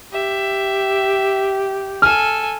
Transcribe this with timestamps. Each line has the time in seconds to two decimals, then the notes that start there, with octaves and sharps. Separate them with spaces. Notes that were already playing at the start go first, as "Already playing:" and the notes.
0.13 G4 E5
2.02 A4 G#5 F6